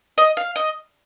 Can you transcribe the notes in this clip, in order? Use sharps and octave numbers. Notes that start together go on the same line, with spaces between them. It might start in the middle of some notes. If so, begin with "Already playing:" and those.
D#5
F5
D#5